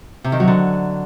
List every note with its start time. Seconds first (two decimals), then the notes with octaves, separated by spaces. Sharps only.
0.24 C3
0.32 D#3
0.40 F#3
0.47 D3